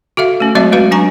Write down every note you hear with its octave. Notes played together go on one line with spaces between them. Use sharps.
F#4 A4 E5 F5
A3 C#4
F#3 G#3 C4 F#4 C#5 E5
G#3 F#4 B4 F5
F#3 D4 G#5 A#5 C#6